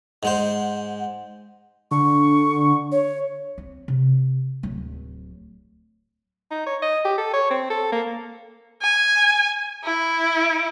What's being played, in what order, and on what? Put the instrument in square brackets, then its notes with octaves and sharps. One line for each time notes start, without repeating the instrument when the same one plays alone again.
[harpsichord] G#2 G#3 C5 [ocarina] F#5
[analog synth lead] D3 [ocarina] C#6
[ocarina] C#5
[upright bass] C4
C3
D1 F#3
[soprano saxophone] D#4
C#5
D#5
G4
A4
C#5
C4
A4
A#3
[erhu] G#5
E4